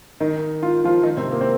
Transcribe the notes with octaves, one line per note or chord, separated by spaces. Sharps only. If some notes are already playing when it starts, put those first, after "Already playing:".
D#3 D#4
F4
F3 F4
D#3 D#4
C3 C4
A#3
C4